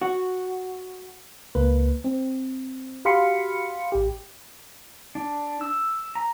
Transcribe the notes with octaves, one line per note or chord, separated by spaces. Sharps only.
F#4
C#2 A#3 B4
C4
F#4 G4 F5 B5 C6 C#7
A1 G4
D4
E6
A#5